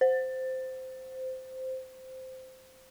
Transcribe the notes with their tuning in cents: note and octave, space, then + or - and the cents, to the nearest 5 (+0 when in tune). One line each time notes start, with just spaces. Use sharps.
C5 -10